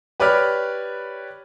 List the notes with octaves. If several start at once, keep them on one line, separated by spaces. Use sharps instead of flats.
G4 B4 C#5 D5 B5 F6